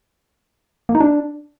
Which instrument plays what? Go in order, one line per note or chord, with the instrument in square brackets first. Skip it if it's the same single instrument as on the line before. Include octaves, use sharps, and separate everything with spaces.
[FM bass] A#3
D#4
D4